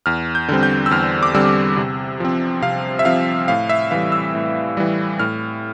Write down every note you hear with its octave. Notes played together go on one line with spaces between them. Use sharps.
E2 F6
G6
D3 G3 C4
G6
E6
E2 F6
D6
D3 G3 C4 E6
C3
F3 C4
C3 F5
E5
F3 C4 F5
A2 F5
E5
E3 G3 F5
E6
A2
E3 G3
A2 F6